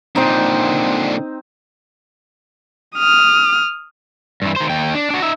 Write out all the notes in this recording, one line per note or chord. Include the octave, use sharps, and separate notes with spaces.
A#2 D3 C4 D#4
D#6 F6
G2 E3
D#3 C5
D#2 G5
D4
D4 F#4
D#4 E5